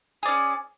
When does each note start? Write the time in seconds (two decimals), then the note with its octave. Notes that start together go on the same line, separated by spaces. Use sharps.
0.23 G#4
0.26 D5
0.28 C#4